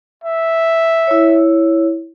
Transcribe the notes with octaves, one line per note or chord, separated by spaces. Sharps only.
E5
E4 C#5